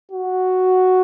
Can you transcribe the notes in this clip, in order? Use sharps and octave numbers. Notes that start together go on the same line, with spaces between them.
F#4